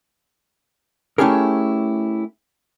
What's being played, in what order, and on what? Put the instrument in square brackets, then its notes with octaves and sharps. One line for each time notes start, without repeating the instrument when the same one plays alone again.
[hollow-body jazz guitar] A3 C#4 E4 G4 G#4 A#4